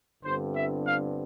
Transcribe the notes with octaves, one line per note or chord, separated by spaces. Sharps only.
G1 G2 D3 G3 C4 C5
E5
F5